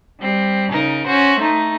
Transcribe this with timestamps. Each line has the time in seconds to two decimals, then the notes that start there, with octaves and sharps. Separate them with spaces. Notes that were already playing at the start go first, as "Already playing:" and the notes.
0.20 G3 C4
0.72 C#3 D#4 A#4
1.08 C#4 F#4 C5
1.41 A3 D#4